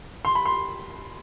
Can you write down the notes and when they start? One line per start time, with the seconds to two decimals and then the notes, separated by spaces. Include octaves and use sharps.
0.25 C6
0.35 B5
0.46 C6